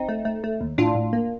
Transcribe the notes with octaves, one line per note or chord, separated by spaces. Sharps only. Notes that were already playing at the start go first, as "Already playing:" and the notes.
Already playing: C4 D#4
A3
A3
A3
D#2
A2 D4 F4
A2
A#3